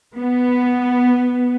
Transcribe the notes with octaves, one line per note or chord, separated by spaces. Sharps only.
B3